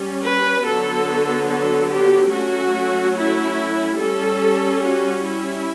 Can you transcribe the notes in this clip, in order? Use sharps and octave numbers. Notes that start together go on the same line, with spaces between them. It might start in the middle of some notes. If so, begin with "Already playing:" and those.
Already playing: G3 C#4
B4
D3 F#3 B3 A4
A4
G4
F#3 A3 C#4 F#4
E4
G3 C#4 A4
F#4
E4